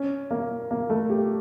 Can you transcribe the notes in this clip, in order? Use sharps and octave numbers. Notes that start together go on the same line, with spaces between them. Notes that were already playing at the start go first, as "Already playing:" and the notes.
Already playing: C#4
A#3
A#3
A3
G4